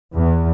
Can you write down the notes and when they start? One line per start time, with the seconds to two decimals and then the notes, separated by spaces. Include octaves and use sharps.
0.13 E2